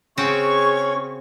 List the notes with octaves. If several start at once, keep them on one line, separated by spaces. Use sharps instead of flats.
C#3 C4 C#4 F#4 G#4 C#5 C#6